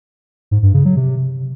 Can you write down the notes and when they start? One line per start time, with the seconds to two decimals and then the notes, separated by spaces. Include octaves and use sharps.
0.51 G#2
0.63 G2
0.74 C#3
0.85 F#3
0.96 C3